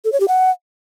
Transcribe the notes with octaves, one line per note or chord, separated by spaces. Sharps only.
A4
C#5
G4
F#5